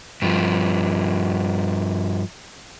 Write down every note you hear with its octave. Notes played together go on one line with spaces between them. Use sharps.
G2 F3